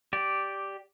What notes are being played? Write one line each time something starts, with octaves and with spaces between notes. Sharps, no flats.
G4 D5